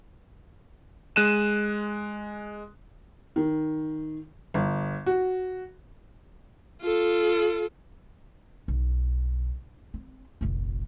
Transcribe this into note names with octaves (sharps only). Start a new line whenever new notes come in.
G#3 F#6 D#7 E7
D#3
G1
F#4
F4 A4
B1
C4
F1 A#1